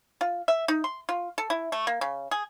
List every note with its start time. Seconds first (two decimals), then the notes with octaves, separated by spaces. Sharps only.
0.21 F4
0.48 E5
0.68 D#4
0.84 C6
1.09 F4
1.38 A4
1.50 E4
1.72 A3
1.87 A#3
2.01 C#3
2.31 G#4